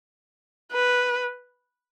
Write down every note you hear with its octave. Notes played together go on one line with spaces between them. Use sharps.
B4